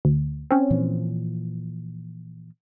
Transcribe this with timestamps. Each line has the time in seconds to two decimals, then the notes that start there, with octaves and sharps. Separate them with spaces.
0.05 D2
0.51 C4 C#4
0.71 A#2 E3 F3